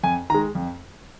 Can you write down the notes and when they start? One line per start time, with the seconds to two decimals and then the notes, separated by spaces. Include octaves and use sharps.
0.03 F2 G#5
0.30 D#3 A#5
0.34 G#3
0.55 F2